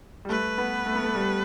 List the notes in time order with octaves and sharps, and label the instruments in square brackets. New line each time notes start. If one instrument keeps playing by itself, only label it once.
[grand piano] G3
[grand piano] A3 [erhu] B4
[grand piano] B3
A3
B3
A3
G3